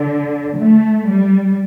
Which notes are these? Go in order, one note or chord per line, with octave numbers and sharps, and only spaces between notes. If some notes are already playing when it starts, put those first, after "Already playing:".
Already playing: D3
A3
G3